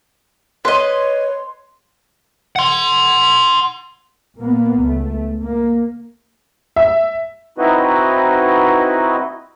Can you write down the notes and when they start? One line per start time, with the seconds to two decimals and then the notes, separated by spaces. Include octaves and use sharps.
0.65 B4 C#5 D#5 C6
2.56 F#5 C6
4.36 A#2 A#3 B3
4.81 C#2 A3
5.42 A#3
6.76 E5
7.58 C4 D#4 E4 F#4 B4 D#5